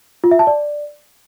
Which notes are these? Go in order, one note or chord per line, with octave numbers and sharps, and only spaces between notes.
F4
E5
A5
D5